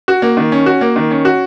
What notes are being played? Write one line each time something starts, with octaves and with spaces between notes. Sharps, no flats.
F#4
A#3
D#3
C#4
F#4
A#3
D#3
C#4
F#4